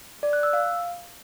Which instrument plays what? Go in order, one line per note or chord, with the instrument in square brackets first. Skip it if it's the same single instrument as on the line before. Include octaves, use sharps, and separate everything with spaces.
[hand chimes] D5
F#6
E6
F5